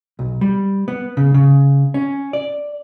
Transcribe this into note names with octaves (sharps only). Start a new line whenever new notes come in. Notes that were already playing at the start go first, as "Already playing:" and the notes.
B1
G3
B3
C#3
C#3
C#4
D5